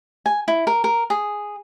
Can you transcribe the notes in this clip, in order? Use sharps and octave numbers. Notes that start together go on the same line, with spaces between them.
G#5
E4
A#4
A#4
G#4